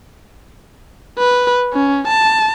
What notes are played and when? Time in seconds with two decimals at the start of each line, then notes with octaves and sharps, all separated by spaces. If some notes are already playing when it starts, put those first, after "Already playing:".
1.18 B4
1.73 C#4
2.08 A5